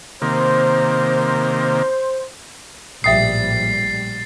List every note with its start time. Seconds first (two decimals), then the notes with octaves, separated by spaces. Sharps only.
0.22 C3 D#3 A#3 C5
3.04 A#1 A2 G3 E5 G5 D#6 A6 C7